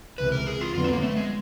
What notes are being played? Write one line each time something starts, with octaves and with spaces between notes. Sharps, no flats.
C#2 C3 E3 B4
A#4
G#4
F4
F2 D3 F#3 B3 F4
C4
A#3
A3
G#3